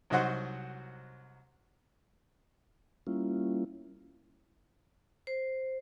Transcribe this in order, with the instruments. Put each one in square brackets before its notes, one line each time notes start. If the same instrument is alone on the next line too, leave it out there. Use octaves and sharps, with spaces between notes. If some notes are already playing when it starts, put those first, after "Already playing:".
[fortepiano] C2 F#3 D#4 F#4 C5 F#5
[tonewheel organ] G3 A#3 C#4 E4 F4
[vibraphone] C5